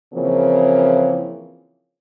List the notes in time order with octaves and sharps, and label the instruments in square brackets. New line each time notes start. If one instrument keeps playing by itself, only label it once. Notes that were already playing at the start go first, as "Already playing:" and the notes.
[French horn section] C#3 E3 F3 A#3 C4